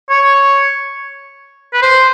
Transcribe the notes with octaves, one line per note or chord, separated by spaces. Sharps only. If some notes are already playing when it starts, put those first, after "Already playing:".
C#5
B4
C5